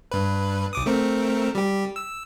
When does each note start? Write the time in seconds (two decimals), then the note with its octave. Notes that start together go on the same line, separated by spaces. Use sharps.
0.11 G2 B4
0.73 B1 D6 D#6
0.86 A3 C4 A#4
1.55 G3 G4
1.96 E6